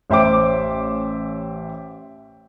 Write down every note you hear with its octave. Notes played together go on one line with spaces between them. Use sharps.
A1 C5 E5 G5 D6